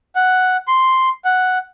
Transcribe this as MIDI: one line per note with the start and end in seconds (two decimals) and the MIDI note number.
0.15 0.57 78
0.68 1.09 84
1.25 1.58 78